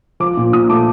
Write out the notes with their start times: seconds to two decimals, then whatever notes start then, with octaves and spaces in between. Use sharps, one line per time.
0.20 F3 D6
0.37 A#2
0.53 A#2 D#6
0.69 A3 D6